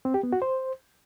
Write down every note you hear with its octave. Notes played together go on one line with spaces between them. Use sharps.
C4
G4
B3
F#4
C5